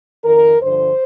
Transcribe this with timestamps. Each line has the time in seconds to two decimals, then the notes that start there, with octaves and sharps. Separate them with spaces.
0.25 F2 D#3 A#4
0.62 G2 D3 F3 C5